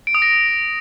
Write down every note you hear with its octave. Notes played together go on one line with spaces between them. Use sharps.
D7
D#6
A#6